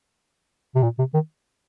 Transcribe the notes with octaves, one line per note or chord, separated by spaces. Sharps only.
C3
A#2
C3
D#3